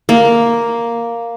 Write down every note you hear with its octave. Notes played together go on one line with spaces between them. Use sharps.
A#3